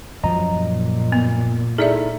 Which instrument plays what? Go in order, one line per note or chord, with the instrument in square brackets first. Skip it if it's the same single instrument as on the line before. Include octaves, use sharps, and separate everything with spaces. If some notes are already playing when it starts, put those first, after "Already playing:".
[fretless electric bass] F#2 F3 F#3 [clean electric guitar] D#5 A#5
[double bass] A#2
[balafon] B3
[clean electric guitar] D#4 E4 A4 [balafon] G#4 D5 E5